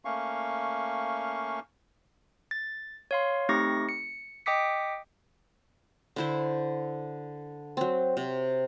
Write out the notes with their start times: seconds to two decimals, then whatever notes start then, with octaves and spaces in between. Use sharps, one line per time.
0.05 A3 A#3 C#4 F5 C#6
2.51 A6
3.11 C#5 F5 C6
3.49 A3 C4 D#4 G4 C#6 A#6
3.89 C#7
4.46 D#5 G5 D6 D#6 B6 C#7
6.16 D3 E4 C5
7.77 F#3 C4
8.17 C3